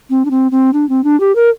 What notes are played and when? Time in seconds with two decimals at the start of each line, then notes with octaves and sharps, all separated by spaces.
0.10 C4
0.25 D4
0.31 C4
0.51 C4
0.73 D4
0.89 C4
1.04 D4
1.20 G4
1.35 A#4